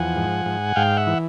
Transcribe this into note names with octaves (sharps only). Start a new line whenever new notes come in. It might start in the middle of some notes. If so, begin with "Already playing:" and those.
Already playing: E2 F3 F#5 G#5
G#2
G#2
G#2 F5 G5
E5 F#5
E3